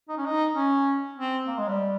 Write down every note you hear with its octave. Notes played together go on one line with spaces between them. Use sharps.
D#4
C#4
D#4
C#4
C4
A#3
G#3
G3